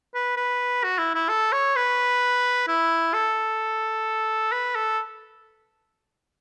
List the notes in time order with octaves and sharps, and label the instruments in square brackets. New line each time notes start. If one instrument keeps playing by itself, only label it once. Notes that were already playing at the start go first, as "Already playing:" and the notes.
[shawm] B4
B4
F#4
E4
E4
A4
C#5
B4
E4
A4
B4
A4